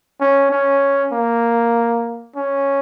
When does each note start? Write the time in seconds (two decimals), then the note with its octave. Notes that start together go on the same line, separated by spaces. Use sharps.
0.21 C#4
0.51 C#4
1.12 A#3
2.36 C#4